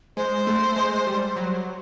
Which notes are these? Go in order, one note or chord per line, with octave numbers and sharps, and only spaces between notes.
G#3 C5
A3
G#3
G3
F#3